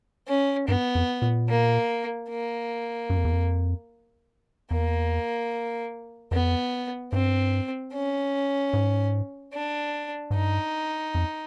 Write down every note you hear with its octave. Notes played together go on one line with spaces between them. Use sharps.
C#4
G2 B3
F2
A#2
A#3
A#3
F#2
F2
E2
F2
E2 A#3
F2 B3
G2 C4
C#4
G#2
D4
G#2
G2 D#4
F2